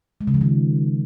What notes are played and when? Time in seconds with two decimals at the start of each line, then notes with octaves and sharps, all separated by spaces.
0.21 G#3
0.27 C#3
0.34 F3
0.41 D#3